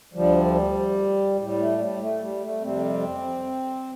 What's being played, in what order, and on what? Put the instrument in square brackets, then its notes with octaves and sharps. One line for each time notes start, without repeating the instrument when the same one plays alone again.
[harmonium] D2 D3 F3 G3
A2 G3
A3
G3
A3
G3
A3
F2 C3 G3 C4